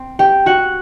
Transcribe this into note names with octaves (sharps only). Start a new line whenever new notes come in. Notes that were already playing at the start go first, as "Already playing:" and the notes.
Already playing: C4
G4 G5
F#4 F#5